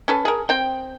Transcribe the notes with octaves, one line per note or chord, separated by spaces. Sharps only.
C#4 A4 B4
G#4 A#4
C4 G5